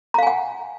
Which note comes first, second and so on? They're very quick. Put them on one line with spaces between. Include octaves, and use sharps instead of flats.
A#5 F5 G#5 F#5